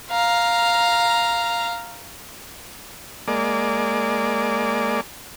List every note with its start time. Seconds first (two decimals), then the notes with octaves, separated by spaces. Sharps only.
0.11 F5 A#5
3.28 G#3 A#3 D5